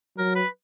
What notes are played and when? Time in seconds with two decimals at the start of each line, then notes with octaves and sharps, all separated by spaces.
0.17 F#3 A#4
0.35 B4